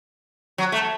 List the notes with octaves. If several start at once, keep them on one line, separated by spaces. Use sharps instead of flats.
F#3
A3